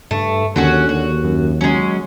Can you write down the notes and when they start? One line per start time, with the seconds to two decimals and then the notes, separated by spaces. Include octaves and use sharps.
0.11 G2 A3
0.56 D#2 D3 F#3 C#4 F#4
0.89 D#2 F#4
1.24 F#2
1.61 F#3 G#3 C#4